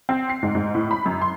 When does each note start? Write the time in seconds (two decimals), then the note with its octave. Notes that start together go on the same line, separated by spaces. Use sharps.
0.09 C4
0.29 C7
0.43 G#2
0.55 G#2
0.74 A2
0.91 B5
1.06 F#2
1.22 C6